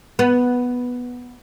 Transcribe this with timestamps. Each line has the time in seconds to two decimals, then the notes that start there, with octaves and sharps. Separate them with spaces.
0.19 B3